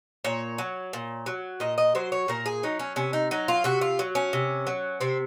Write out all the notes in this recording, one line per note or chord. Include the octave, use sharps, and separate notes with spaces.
A#2 C#5
F#3
A#2
F#3
A#2 D#5
D#5
F#3 C5
C#5
A#2 A#4
G#4
F#3 D#4
C#4
C3 C#4
D#4
F#3 D#4
F4
C3 F#4
F4
F#3
C#4
C3
F#3
C3 C4